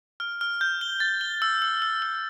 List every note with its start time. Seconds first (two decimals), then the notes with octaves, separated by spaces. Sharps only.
0.20 F6
0.41 F6
0.61 G6
0.81 G7
1.00 A6
1.21 G7
1.42 E6
1.62 E6
1.82 E6
2.02 E6